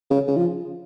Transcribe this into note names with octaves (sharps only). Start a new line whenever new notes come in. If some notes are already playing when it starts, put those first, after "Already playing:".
C#3
C#3
F3